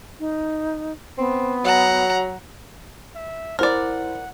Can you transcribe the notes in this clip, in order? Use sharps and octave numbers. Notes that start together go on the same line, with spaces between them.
D#4
B3 C4
F#3 F#5 A#5
E5
E4 A#4 C5 D5 F#5